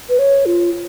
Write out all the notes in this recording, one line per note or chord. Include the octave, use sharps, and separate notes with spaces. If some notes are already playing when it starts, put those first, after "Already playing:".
B4
C#5
F4